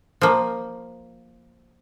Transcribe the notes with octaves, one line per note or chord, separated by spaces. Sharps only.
F3 A#3